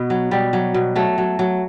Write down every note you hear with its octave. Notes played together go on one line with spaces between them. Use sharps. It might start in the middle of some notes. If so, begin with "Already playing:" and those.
Already playing: B2 B3
F#3
B2 G3
F#3
B2
F#3 A3
F#3
F#3